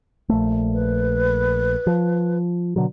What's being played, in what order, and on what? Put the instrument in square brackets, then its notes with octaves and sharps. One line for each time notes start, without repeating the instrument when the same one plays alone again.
[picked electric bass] A#1 A3
[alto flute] B4
[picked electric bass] F3
B2 D3 F#3